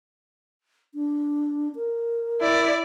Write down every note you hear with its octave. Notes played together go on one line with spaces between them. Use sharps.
D4
A#4
E4 D5